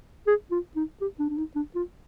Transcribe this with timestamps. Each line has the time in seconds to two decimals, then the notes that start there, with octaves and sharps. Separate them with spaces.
0.27 G#4
0.51 F4
0.76 D#4
1.01 G4
1.19 D4
1.30 D4
1.38 D#4
1.56 D4
1.75 F4